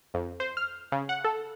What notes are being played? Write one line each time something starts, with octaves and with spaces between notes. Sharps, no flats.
F2
C5
F6
C#3
F#5
A4